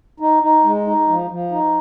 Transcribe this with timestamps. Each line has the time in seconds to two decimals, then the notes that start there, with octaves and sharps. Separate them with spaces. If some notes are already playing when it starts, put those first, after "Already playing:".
0.20 D#4
0.43 D#4
0.64 G#3
0.87 D#4
1.08 F3
1.30 F3
1.51 D#4